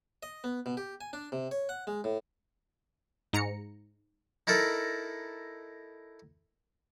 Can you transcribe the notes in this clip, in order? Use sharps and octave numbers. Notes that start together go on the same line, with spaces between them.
D#5
B3
B2
G4
G#5
D4
C3
C#5
F#5
G#3
A2
G#2 A#5 C#7
D#4 E4 A4 A#4 B5